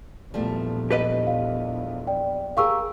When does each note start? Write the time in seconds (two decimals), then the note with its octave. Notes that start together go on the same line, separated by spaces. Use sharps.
0.34 A#1 E2 F3 G3 A3
0.91 G4 B4 D#5
1.27 F5
2.07 D5 G5
2.57 G4 G#4 A#4 F5 C#6 E6